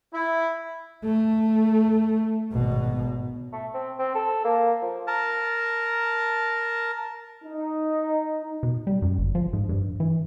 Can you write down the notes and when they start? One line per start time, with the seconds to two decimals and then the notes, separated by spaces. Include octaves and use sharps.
0.13 E4
1.05 A3
2.53 G#1 B2
3.53 A3
3.74 C4
3.99 C4
4.15 A4
4.44 A#3
4.82 F3
5.07 A#4 A5
7.44 D#4
8.63 B2
8.87 G3
9.02 F#2
9.19 G1
9.35 F3
9.53 G#2
9.69 G2
10.00 E3